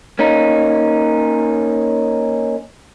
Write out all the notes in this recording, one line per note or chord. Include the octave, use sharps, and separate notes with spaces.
A#3 C#4 D#4